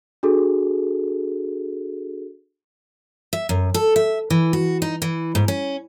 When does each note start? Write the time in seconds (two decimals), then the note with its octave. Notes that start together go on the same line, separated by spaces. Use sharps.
0.23 D4 F#4 G#4 A4
3.33 E5
3.49 F#2
3.74 A4
3.96 E5
4.30 E3
4.53 F#4
4.82 D#4
5.02 E3
5.35 G#2
5.48 C#4